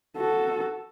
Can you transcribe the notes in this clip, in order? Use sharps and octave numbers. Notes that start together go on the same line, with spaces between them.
F#4 A4